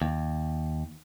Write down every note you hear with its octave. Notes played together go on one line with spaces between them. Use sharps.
D#2